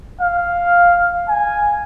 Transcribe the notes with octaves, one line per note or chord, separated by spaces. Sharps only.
F5
G#5